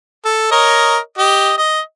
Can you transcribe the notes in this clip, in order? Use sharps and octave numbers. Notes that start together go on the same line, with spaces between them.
A4
A#4 C#5 D#5
G4 D#5
D#5